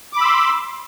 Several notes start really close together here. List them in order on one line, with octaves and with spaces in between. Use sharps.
D6 B5 E6 C6